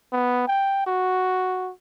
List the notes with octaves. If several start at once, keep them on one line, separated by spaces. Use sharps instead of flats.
B3
G5
F#4